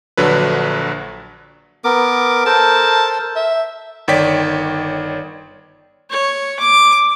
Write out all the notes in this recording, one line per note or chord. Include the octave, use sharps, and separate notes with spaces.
A#1 D3 F#3 B4
B3 A#4 D6
A4 A#4 C5 A5
E5
G1 D#3 C#5 D5 G5 B6
C#5
D6